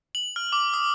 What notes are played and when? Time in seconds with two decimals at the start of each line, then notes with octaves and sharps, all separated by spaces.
0.15 F#7
0.36 F6
0.53 D6
0.74 D#6